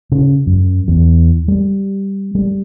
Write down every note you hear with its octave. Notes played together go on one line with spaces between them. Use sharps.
C#3
F#2
E2
G3
G3